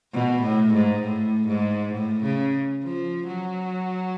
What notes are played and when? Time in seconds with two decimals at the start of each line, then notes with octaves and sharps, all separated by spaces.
0.13 B2
0.42 A2
0.73 G#2
1.02 A2
1.47 G#2
1.93 A2
2.23 C#3
2.83 F3
3.27 F#3